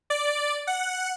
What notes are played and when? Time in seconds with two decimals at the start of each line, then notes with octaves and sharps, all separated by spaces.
0.10 D5
0.67 F#5